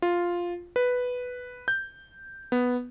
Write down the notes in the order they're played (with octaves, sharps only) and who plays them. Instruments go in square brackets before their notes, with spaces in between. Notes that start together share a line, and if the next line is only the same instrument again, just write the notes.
[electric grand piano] F4
B4
G6
B3